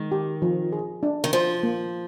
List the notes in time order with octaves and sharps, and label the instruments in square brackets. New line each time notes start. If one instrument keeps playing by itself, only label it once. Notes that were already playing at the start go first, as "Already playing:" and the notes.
Already playing: [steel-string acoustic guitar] D#3 [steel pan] G#3
[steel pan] G4
F3
G#4
D4
[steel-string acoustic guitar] D#3
[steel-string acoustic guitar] F3 [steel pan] C5
[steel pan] A#3